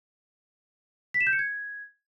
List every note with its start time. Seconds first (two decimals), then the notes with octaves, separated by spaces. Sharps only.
1.14 B6
1.21 E7
1.27 G6
1.33 C#7
1.39 G#6